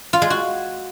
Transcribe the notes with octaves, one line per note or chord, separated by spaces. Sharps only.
F4
G#3
F#4